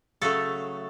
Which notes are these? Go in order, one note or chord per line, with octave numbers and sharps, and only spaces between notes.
C#3 F#3 A3 A4